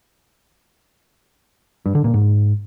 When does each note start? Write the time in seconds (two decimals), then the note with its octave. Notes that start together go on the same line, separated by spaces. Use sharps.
1.86 G2
1.95 D3
2.04 A#2
2.14 G#2